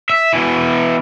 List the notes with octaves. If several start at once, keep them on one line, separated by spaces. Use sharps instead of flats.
E5
B2 E3